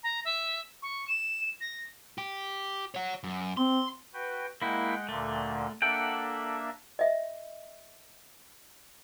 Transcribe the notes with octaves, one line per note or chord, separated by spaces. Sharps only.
A#5
E5
C#6
E7
A#6
G4
C#5 F#5
F#2
C4 C6
F#4 B4 G5
G#3 A#3 E4 F#5 G5
D2 A#2 D3 A3
A#3 D4 A4 E5 F#5 G5
D#5 E5